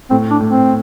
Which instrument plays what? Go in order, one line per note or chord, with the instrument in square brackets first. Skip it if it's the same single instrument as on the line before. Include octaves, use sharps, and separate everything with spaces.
[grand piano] A2 [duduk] C4
[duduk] D4
[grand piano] A2
[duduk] C4